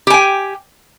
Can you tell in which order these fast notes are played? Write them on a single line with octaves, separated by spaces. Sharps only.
G4 G#5 G5